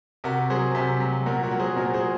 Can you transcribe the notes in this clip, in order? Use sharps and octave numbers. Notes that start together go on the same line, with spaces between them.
C3 F#4 A#4
F#3 G#4 C5
C3
F#3
A#2 F#4 A#4
F#4 A#4
F#3
G#4 C5
A#2 F#4 A#4
G#4 C5